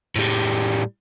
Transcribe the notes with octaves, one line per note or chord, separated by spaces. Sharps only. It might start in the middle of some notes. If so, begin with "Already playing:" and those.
A2 G3